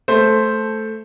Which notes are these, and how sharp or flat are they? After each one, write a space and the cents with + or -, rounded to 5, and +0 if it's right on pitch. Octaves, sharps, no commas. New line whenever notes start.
A3 -5 A4 +0 C5 +0